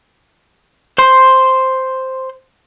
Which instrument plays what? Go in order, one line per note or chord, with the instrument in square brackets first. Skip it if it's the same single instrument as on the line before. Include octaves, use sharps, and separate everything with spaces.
[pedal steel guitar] C5 C6